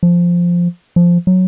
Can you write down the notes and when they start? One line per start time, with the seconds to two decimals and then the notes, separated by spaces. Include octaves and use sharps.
0.03 F3
0.96 F3
1.27 F#3